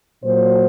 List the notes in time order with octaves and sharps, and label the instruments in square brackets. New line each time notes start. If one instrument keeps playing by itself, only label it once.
[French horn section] A#2 F#3 C5